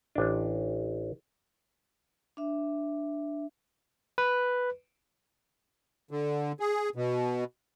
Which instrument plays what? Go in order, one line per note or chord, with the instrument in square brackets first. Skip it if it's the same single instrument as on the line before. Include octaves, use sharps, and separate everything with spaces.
[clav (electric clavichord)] A1 D4
[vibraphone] D4 E5
[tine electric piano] B4
[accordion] D3
G#4
B2